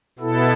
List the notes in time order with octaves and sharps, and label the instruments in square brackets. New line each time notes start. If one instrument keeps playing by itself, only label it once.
[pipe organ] B2 B3 E4 A4